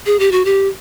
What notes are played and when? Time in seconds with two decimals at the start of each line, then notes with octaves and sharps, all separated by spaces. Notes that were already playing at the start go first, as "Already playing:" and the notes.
0.06 G#4
0.19 G4
0.32 F#4
0.45 G4